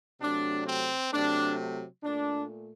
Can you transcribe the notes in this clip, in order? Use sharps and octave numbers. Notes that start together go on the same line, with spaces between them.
C3 F#3 A3 D4
C4
C3 F#3 A3 D4
A#2 A3 D4